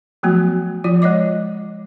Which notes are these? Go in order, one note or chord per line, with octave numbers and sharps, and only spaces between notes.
F3 F#3 A3 B3 F#4
F3 F4 D5
G#3 C#5 D#5 D6